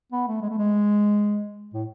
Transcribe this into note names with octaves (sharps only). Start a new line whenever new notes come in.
B3
A3
G#3
A3
G#3
A2